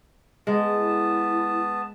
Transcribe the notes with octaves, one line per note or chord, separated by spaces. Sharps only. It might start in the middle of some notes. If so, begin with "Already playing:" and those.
G#3 B3 A5
E4